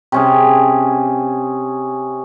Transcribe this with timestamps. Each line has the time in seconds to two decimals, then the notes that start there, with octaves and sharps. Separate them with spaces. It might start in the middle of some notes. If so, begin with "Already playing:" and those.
0.12 C3 C#4 G#4